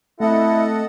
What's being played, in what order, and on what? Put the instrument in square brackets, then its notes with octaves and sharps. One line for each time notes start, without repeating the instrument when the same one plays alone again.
[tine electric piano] A3 C4 [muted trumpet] E4 [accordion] A4 D#5 F#5